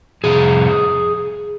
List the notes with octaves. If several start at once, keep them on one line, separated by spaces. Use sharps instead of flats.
F2 C3 G#4